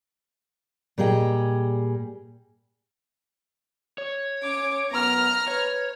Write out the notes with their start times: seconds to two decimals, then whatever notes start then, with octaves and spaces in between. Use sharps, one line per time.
0.98 A#2 G3 G#4 D#5 G5
3.98 C#5
4.43 C#4 D6
4.91 F#2 B3 A#5 F6
5.48 B4 C#5